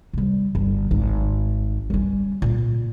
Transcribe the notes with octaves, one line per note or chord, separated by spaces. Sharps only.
C3 G3
G1
G#1 D#4
G3 C#4
A#2